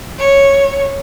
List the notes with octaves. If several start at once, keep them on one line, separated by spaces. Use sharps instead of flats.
C#5